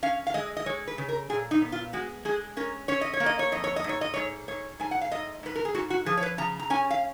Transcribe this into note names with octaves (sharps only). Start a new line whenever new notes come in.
C#4 F5
F5
G#3 D#5
D#5
G#3 C#5
B4
C#3
A#4
A#2 G#4
D#4
B3
F4
G#3 F#4
G#3 G#4
C#4 A#4
C#4 C#5
D#5
C#5
A#3
D#5
C#5
F2 D#5
C#5
D#5
G#2
C#5
D#5
G#2 C#5
G#2 C#5
G#2 G#5
F#5
F5
G#2 D#5
G#2 B4
A#4
G#4
G#2 F#4
F#4
F3 G#4
C#5
B4
C#3 A#5
A#5
C#4 G#5
F5